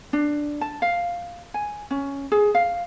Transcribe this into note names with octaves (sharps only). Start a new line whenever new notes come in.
D4
A5
F5
G#5
C#4
G#4
F5